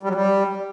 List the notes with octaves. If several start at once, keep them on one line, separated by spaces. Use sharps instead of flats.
G3
F#3
G3